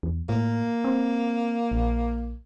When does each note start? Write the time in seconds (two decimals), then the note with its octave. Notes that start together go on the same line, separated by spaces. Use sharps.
0.03 E2
0.29 A2 A#3
0.84 C4
1.71 A#1